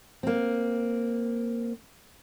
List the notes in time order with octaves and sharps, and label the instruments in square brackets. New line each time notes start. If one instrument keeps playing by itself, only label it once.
[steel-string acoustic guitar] A#3 C4